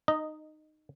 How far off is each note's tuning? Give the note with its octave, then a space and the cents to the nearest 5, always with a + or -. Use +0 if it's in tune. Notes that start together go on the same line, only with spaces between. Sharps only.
D#4 -15 D#5 +0